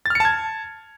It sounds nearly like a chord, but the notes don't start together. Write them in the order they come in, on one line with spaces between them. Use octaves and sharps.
A6 F6 C#7 A5 G#6